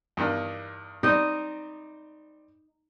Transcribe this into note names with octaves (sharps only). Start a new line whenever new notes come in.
E2 G2 D#3
G3 C4 D#4 D#5